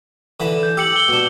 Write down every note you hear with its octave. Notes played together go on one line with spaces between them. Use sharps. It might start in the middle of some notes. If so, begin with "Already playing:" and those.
D3 E3 B5
G6
G4 E6 C#7 F#7
G7
B2 D4